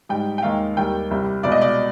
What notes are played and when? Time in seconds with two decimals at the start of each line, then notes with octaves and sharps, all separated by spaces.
0.09 G#2 G3 G5
0.38 G5
0.43 D#2 D#3 G#3 F5
0.77 D#2 D#3 G3 G5
1.11 C2 C3 G3
1.43 C2 B2 G#3 D5
1.52 D#5
1.61 D5